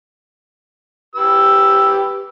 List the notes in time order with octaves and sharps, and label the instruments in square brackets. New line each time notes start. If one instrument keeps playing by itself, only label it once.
[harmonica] G4 B4 E6